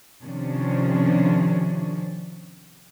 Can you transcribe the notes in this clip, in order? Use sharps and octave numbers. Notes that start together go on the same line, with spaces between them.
C3 D#3 F3 C#4 D4